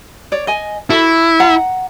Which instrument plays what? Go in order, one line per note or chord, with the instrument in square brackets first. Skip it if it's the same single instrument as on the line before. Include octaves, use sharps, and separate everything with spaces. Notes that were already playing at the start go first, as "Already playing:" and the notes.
[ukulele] C#5 D5
D#5 G#5
[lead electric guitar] E4 [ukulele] F#4 A4
[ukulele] F#5 A#5